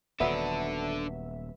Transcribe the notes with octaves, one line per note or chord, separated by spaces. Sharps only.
D#1 F#3 B3 D4 A4 E5